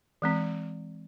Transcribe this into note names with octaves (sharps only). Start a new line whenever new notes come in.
E3 G#3 C4